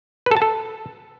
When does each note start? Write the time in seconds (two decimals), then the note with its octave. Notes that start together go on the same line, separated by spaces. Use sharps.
0.26 B4
0.31 A4
0.37 A5
0.42 A4